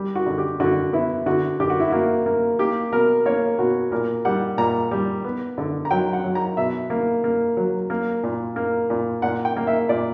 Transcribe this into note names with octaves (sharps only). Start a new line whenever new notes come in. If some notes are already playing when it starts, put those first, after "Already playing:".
Already playing: G3
F#4
D3
G4
D3 F#4
B3 E4
D3 F#4
D3 G4
F#4
E4
A#3 F#4
A#3
A#3 G4
B2 A#4
A#3 C#5
B2 F#4
A#2 A#4
G3 F#5
A#2 A#5
G3
B3
D3
A#5
F#3 G5
F#5
F#3
A#5
B2 E5
A#3
A#3
F#3
A#3
A#2
A#3
A#2
A#2 F#5
G5
A#3
E5
A#2 D5